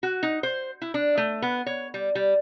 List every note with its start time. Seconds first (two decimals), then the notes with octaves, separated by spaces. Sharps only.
0.03 F#4
0.23 D#4
0.43 C5
0.82 E4
0.94 D4
1.17 A3
1.42 B3
1.66 C#5
1.94 G3
2.15 G3